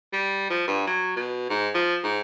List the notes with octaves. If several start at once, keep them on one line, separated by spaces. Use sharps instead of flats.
G3
F3
G2
F#3
B2
G#2
F3
G#2